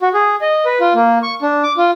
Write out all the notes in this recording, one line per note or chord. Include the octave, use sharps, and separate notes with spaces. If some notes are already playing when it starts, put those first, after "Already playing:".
F#4
G#4
D#5
B4
F4
A#3
C#6
D4
D6
F4